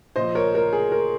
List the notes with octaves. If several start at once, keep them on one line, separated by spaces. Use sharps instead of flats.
A#2 F3 C5 D#5
A#4 C#5
A#4
G#4
A#4